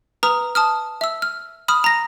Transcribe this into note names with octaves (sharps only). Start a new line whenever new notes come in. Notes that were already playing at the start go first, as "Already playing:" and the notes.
B4 A#5 D#6 F6 F7
A5 D#6 F6
E5 E6
F6
B5 D#6 F6
A#5 A#6